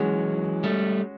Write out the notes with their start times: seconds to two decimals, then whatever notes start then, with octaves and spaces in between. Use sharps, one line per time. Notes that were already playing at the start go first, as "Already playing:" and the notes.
Already playing: E3 F#3 G#3 C#4 F#4
0.64 G3 A3